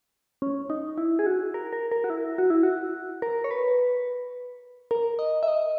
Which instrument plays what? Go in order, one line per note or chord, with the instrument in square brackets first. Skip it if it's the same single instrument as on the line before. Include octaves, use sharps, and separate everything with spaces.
[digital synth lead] C#4
D#4
E4
G#4
F#4
A#4
A#4
A#4
F#4
E4
F#4
E4
F#4
A#4
C#5
B4
A#4
D#5
E5
D#5